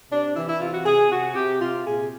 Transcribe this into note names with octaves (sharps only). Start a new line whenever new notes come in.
C3 D4
E3 E4
E4
C3 F4
F#4
C3 G#4
C3 F#4
C3 G4
C3 F4
A#2 G#4